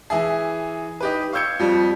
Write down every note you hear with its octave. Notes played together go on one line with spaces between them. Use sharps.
E3 E4 G#4
D#4 G4 B4
F5 C#6 E6 G6 G#6 C#7
F2 F3 G3